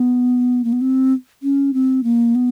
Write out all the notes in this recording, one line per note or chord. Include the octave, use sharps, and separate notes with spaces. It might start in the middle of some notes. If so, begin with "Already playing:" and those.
Already playing: B3
A#3
B3
C4
C#4
C4
A#3
B3